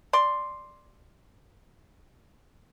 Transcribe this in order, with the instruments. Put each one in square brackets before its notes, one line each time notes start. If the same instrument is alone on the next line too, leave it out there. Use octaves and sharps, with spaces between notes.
[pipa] D5 C6